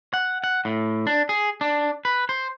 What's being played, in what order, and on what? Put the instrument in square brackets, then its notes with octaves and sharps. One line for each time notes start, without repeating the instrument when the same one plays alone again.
[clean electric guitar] F#5
F#5
A2
D4
G#4
D4
B4
C5